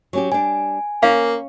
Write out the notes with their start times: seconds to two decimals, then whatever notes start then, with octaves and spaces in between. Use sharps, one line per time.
0.13 F#3 C#4 G4
0.32 G3 D4 G#5
1.03 A#3 C#4 F5